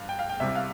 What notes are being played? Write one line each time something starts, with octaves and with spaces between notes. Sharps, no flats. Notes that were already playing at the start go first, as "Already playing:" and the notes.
Already playing: G2 F5
G5
F5
G5
C2 C3 G3 E5
F5